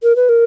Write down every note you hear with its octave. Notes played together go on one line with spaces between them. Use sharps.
A#4
B4
A#4